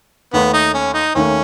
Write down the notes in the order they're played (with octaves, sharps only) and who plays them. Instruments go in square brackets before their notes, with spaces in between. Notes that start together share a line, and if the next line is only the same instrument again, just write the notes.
[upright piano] D#2 D#3 A3 [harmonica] B3
[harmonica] D#4
C#4
D#4
[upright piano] D#2 D#3 A3 [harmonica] C#4